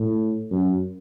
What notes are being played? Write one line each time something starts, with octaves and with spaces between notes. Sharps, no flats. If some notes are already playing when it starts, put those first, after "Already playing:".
Already playing: A2
F#2